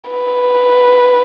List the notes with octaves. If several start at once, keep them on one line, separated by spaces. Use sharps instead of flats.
B4